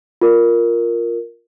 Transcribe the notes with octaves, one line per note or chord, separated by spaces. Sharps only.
F4 A#4